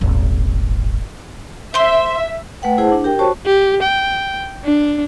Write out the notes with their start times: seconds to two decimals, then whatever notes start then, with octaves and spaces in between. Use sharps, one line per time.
0.01 D#1 G#1
1.74 C5 E5 C6
2.62 A3 B4 F#5 G5
2.78 E4 G#4 C5 F#5 A5
2.92 D4
3.04 G4 A#4 G5
3.19 F#4 C5 C#5 A5 C#6
3.46 G4
3.83 G5
4.64 D4